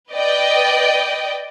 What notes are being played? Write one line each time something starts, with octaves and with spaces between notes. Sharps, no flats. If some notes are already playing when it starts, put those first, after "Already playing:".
B4 D5 D#5 G5